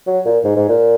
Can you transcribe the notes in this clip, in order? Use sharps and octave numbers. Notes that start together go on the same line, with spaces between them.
F#3
A#2
G#2
G#2
A#2